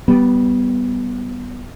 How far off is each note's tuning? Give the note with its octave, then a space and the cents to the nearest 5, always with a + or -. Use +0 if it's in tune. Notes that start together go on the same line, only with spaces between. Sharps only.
G3 -20 B3 +0